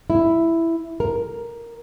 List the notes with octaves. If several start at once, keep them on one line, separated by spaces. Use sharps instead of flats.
E4
A#4